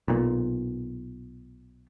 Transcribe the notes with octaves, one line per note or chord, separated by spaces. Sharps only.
B1 A#2